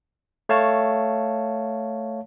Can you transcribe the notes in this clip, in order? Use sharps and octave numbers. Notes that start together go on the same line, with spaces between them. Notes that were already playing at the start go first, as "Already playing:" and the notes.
A3 C#5 F5 A5